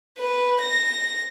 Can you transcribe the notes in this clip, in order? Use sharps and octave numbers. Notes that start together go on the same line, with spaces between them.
B4
A#6